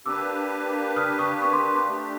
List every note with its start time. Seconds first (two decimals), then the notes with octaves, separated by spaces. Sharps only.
0.06 A#3 D4 G4 B4 D6 E6
0.96 D#6 F6
1.19 C#6 D#6
1.42 C#6 D#6
1.53 C6 D6
1.75 C6 D6
1.88 A3 D4 G4